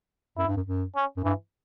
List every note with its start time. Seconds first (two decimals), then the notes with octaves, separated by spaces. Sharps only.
0.38 F#2 E4
0.47 G2
0.56 F#2
0.67 F#2
0.96 C#4
1.17 F#2
1.24 G2 E3